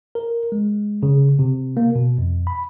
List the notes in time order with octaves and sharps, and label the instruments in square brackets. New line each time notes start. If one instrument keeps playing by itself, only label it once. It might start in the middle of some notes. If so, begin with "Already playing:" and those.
[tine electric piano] A#4
G#3
C#3
C3
A#3
B2
F2
B5